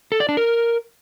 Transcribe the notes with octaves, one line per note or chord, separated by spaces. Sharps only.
A4
D5
D4
A#4